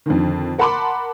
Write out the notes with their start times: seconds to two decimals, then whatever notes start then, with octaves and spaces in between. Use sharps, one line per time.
0.06 F2 D3 D#3
0.58 A#4 F#5 A5 B5 C6 D6